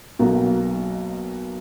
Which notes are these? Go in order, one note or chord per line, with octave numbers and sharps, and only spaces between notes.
B1 B2 F#3 A#3